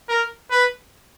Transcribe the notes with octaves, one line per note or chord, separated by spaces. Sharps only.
A#4
B4